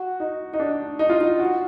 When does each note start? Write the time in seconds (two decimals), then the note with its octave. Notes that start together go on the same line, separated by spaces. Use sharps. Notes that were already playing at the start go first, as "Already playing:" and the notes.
Already playing: F#4
0.20 D#4
0.53 D#4
0.60 D4
0.99 D#4
1.10 F4
1.21 D#4
1.39 F#4